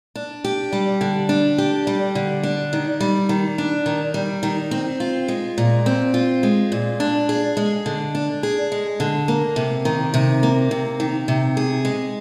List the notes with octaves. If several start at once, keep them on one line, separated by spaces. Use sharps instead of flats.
D4
G4
G3
D3
D4
G4
G3
D3
D4
D#3
G3
D#3
D4
D#3
G3
D#3
C4
F4
G#3
A#2
C4
F4
G#3
A#2
D4
G#4
G#3
D3
D4
G#4
G#3
D3
A#3
C3
D#3
C3
A#3
C3
D#3
C3
G#4
G#3